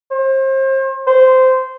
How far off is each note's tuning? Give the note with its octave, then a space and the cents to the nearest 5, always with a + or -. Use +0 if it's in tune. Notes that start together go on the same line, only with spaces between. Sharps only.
C5 +35
C5 -15